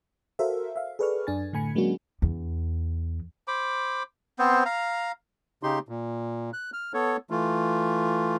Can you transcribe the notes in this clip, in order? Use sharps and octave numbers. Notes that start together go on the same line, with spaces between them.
F#4 A4 A#4 C5 E5 F5
E5 F5
G#4 A4 B4 D5 C#6 F6
F#2 D4 G#5 A6
A2 D3 A3 G#5 B5 C#7
F#3 G#3 A#3 C#4 D4 F#4
E2
C5 B5 D6
B3 C4 C5
F5 A#5
C#3 D#4 G4 C6
A#2
F#6
F6
B3 A4 C#5
E3 A3 F4